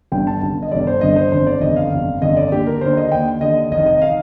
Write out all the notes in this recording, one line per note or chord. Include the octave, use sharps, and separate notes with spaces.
G1 G2 D3 G5
A5
G1 G2 D3
D#5
G1 G2 D3 D5
C5
G1 G2 D3 D#5
C5
G1 F2 D3 C5
D5
G1 F2 D3 D#5
F5
G1 F2 D3
G1 F2 D3 D#5
D5
D#2 D3 G4
A#4
D#2 D3 C5
D#5
D#2 D3 G5
D#2 D3 D#5
F1 F2 D#3 D#5
D#5
F5
D#3